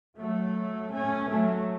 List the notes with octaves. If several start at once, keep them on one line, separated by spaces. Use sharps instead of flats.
F#3 A3
A3 C#4
F#3 A3